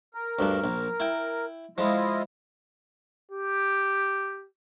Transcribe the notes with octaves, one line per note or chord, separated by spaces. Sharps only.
A#4
D2 G2 D4
A#1
E4 G5
F3 G#3 E4 F4 D#5
G4